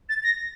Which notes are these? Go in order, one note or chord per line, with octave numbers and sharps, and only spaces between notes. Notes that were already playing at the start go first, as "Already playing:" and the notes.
A6
A#6